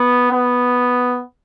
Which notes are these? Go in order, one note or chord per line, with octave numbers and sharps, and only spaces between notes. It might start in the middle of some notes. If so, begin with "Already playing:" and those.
Already playing: B3
B3